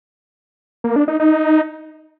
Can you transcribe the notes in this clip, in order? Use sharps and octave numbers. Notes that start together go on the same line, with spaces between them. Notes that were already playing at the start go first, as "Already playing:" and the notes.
A#3
D4
D#4
D#4